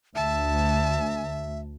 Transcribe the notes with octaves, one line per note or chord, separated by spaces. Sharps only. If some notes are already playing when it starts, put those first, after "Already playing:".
D2 E5 A5